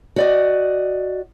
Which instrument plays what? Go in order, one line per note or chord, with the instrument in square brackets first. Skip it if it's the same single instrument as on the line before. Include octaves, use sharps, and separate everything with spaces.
[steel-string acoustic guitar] F#4 D5 D#5